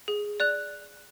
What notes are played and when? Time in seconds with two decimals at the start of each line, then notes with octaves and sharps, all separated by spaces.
0.08 G#4
0.40 D5 F#6 F7